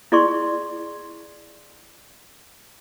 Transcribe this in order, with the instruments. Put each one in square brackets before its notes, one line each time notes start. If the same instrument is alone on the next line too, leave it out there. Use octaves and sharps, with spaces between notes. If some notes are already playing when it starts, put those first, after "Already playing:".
[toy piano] E4 G#4 D5 C6 C#6